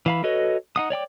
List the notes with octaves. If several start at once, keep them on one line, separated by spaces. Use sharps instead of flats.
E3 F5 B5
F#4 A4 B4 C#5 D#5
D#4 F#5 D#6
C#5 D5 G5 D6